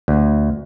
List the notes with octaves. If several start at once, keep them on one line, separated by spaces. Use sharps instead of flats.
D2